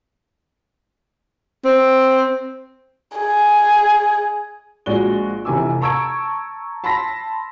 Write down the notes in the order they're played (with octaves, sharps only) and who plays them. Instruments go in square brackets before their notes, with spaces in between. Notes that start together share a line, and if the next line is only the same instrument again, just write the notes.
[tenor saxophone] C4
[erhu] G#4
[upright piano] A#1 G#3 F#4 D5 G7
F1 C3 E3 G#5 D6 E6
A5 A#5 C#6 E6 G#6 D7
A5 B5 C6 E6 A#6 B6